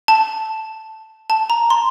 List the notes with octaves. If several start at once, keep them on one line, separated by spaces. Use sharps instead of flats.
A5
A5
A#5
C6